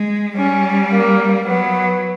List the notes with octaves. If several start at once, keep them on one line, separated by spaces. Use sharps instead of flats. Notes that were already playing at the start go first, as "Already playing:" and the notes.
Already playing: G#3
G3 C#4
A#3
F#3 B3